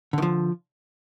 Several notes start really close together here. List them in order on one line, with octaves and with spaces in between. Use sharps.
D3 D#3 F3